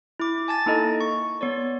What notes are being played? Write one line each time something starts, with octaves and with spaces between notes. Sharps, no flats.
E4 D6
G#5 A5 A6
A#3 D#4 E4 A4 D#5
C#6
B3 C#5 D5